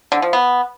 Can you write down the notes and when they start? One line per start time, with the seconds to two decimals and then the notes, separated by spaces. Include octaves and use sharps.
0.12 D3
0.22 F3
0.33 B3